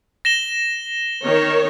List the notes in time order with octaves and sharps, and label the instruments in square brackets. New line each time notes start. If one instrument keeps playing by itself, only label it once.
[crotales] A#6 E7 G7
[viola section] D#3 A#4 C#5